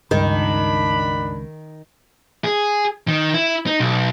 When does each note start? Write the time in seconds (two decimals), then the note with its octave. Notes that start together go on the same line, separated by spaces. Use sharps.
0.11 C#2 G2 D#3 D4 B5
2.44 G#4
3.08 D#3
3.34 E4
3.67 D#4
3.80 B1